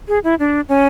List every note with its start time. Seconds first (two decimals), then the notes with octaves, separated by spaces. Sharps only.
0.08 G#4
0.24 E4
0.39 D4
0.69 C#4